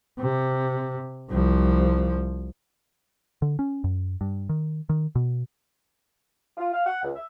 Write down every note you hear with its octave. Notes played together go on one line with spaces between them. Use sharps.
C3
C2 F3
D3
C#4
F#2
G2
D#3
D#3
B2
F4
F5
F#5
C#2
E5